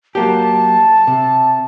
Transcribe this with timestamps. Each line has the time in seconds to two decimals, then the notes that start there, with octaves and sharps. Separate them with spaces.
0.15 F#3 A#3 G4 A5
1.07 C3